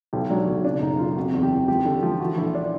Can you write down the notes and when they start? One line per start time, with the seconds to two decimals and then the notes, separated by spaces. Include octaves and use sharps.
0.13 B1 G4
0.30 F#3 D4
0.47 B1
0.65 C#3 D4
0.82 F#1 D#4
0.99 F#1 F4
1.16 C3 F#4
1.33 E2
1.43 G4
1.51 E3
1.68 F3 G4
1.86 D3
2.03 F3
2.20 E3 F#4
2.37 A#1 E4
2.55 D4